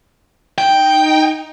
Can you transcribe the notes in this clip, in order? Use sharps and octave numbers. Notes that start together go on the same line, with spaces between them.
D#4 G5